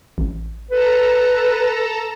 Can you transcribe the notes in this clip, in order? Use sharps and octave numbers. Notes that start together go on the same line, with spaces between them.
A1
A4 B4 A5 A#5